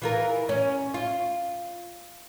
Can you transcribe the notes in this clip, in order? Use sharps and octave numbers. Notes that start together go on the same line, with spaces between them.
E3 F4 A#4
C#4
F4